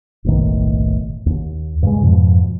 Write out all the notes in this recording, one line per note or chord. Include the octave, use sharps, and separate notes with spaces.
F#1 B1 A2 D#3
D#2
G2 C#3 G#3
F2 G#2 B2 F3